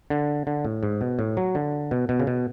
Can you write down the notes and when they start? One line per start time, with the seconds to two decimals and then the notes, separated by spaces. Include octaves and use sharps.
0.10 D3
0.47 D3
0.65 A2
0.83 G#2
1.01 B2
1.19 A2
1.37 F#3
1.55 D3
1.91 B2
2.09 B2
2.19 C#3
2.27 B2